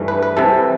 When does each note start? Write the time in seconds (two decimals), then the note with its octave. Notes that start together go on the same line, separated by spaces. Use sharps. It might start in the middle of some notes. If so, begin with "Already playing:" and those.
Already playing: G2 E3 A3
0.08 B4
0.23 B4
0.37 C2 C3 E3 A4